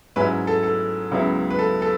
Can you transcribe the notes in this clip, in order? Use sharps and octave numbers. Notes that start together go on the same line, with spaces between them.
G#2 F#3 C#4 E4 B4
A4
A4
C#2 C#3 F#3 B3 E4
B4
A4
A4